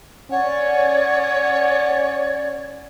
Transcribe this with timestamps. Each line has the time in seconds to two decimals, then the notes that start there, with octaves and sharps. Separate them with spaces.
0.31 C#4 C#5 D5 F#5